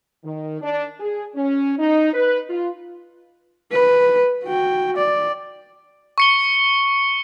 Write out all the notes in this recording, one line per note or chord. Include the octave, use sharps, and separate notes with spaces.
D#3
D4
G#4
C#4
D#4
B4
F4
B4
F#4 G5
D5
C#6 C#7 G7